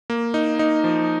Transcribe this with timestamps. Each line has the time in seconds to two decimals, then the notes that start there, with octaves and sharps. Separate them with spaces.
0.10 A#3
0.34 D#4
0.59 D#4
0.84 F3